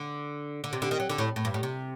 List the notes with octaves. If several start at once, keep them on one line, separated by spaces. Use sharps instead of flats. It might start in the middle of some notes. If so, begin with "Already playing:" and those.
Already playing: D3
D3
C3
D3
D#3
F#3
D3
A2
A2
G2
A2
C3